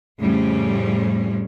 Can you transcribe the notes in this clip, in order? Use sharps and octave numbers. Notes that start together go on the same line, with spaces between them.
F2 A2 C#3 G3 C4 C#4